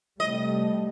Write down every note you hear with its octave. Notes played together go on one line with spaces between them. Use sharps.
C3 G3 A3 D#5